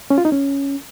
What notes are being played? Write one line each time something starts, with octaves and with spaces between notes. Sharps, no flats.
C#4
F4
D#4
C#4